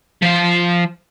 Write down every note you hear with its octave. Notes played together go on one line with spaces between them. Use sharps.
F3 F5